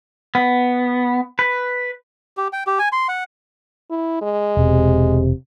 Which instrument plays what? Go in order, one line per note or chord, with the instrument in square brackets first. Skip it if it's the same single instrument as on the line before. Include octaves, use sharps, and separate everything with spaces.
[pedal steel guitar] B3
B4
[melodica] G4
G5
G4
G#5
C6
F#5
[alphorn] E4
G#3
[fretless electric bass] E1 [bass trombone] C3